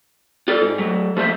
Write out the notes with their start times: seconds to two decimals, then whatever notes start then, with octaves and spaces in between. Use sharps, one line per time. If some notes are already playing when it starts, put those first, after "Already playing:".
0.48 F4 A4 D5
0.61 G#2
0.78 F#3 A3
1.17 F3 A3 A#3 C5 E5